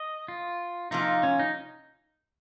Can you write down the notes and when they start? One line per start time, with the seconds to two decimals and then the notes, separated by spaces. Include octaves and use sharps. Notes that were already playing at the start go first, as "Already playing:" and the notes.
Already playing: D#5
0.28 F4
0.91 C3 F3 A#3 D#4 F4
1.23 C#4
1.39 D#4